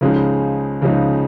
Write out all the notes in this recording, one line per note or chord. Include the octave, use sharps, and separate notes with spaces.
C#2 C#3 F3 G#3 D#4
C#2 C#3 F3 G#3 D#4